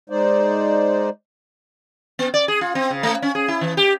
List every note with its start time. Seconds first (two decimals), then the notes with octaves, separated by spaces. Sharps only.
0.10 G#3 D#4 C5 D5
2.19 B3
2.34 D5
2.48 G#4
2.61 F4
2.75 C4
2.90 C#3
3.03 A3
3.22 C#4
3.35 G#4
3.48 E4
3.61 E3
3.77 G4